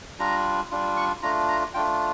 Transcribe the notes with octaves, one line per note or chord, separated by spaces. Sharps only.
G3 D4 F4 A#5
G3 D4 F4
C#6
A3 D4 F4 A#5
A#5
A3 D4 F4 G5